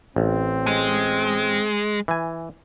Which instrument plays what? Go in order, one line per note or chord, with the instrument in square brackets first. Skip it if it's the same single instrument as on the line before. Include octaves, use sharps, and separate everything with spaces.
[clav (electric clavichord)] A1 [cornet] C4
[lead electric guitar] G#3
[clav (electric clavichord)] E3 G#5